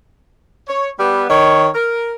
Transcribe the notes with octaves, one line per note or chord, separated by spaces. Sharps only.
C#5
G3 B3
D#3 C#5
A#4